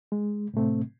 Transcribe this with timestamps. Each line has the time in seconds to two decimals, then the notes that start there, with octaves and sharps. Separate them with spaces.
0.12 G#3
0.54 A2 C3 A3 C4